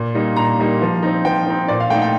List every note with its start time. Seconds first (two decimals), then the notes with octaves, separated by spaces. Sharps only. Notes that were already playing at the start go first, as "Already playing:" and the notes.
Already playing: A#2
0.14 G3 A#3 D#4
0.36 A#2 A#5
0.59 G3 A#3 D#4
0.81 F3
1.03 C4 D#4
1.25 F3 G5
1.47 C4 D#4
1.68 A#2 D5
1.80 F5
1.90 A3 D#4 G5
2.02 G5